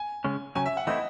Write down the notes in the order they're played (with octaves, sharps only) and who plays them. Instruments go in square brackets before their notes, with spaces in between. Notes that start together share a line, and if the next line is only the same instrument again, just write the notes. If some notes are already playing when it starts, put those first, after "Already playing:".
Already playing: [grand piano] G#5
[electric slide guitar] C#3 G#3 C#4
[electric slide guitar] C#3 F#3 C#4 [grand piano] G#5
[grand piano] E5
F#5
[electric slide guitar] E3 A3 C4 E4 [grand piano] D#5